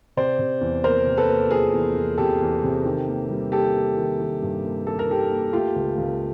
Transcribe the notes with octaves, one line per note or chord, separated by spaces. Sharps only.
C3 C5 D5
C3
E2
A#3 A#4 C5
C3
A4 B4
A#3
F3 G#4 A#4
E2
E2
C3 G4 A4
E2
C3
D#3
A#3
G3
A#3 G4 A4
A#3
D#3
D#3
G2
A#3
A#3 A4
A#4
D#3 G4 A4
A#3
A3 F4 G4
C#2
C#2